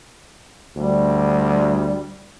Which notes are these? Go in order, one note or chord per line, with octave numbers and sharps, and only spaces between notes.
D2 G3